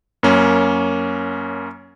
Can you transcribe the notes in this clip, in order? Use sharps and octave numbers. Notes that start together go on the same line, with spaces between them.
F#2 A#3 C#4